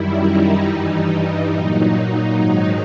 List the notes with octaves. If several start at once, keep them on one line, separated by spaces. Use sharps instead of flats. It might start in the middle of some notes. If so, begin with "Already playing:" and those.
Already playing: F#2 D#3 G3 E4
D#4
G2 E3 G3
A#2 F#3
G#2 D#3 F#3 D#4